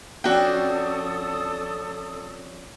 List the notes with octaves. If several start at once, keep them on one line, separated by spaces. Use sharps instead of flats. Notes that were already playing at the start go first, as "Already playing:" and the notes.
F2 C#4 D4 F#4 A4 G5 D#6